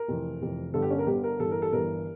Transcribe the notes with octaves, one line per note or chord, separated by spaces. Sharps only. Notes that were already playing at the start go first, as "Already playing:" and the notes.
Already playing: A#4
F1 F2 E3
F1 F2 E3
G1 G2 D3 A4
G4
C#4
A#4
G1 G2 D3 G4
A#4
G1 G2 E3 A4
A#4
A4
G1 G2 E3 A#4